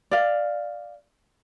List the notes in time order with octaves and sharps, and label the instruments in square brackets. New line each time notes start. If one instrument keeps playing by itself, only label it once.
[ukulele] D5 F5